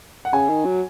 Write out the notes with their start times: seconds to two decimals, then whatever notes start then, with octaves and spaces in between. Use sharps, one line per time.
0.25 F#5
0.33 C#3 G#5
0.50 D#3
0.65 F#3